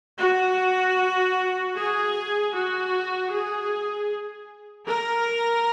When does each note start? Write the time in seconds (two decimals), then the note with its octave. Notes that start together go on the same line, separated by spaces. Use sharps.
0.20 F#4
1.77 G#4
2.54 F#4
3.33 G#4
4.88 A#4